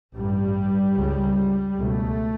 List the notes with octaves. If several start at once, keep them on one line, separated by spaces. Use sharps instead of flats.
A1 G2 G3
C#2 C#3
C#2 B2 A3